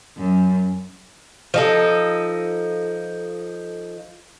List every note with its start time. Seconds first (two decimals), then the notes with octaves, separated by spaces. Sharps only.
0.17 F#2
1.54 F3 D#4 A4